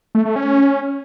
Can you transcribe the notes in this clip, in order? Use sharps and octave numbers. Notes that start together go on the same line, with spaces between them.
A3
A3
C#4